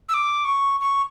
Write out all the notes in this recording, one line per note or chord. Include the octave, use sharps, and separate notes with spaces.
E6
D6
C#6
C#6